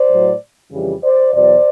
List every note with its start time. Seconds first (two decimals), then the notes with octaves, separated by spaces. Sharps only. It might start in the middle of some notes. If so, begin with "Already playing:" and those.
Already playing: C5 D5
0.10 A2 F#3
0.72 F2 C#3 E3 G3
1.03 C5 D5
1.34 E2 B2 F#3 C5 D5